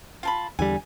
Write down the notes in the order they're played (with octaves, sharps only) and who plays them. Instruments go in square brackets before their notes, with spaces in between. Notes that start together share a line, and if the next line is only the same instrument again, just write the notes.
[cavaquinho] F4 A5 B5
[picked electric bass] E2 D3 G3 [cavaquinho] G#5